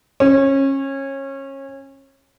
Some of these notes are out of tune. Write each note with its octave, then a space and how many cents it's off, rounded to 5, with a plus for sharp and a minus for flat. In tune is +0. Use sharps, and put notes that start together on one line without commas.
C#4 -25